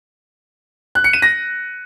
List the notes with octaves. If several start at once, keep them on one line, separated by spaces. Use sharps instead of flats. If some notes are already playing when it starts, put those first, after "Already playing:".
F#6
C#7
D#7
A#6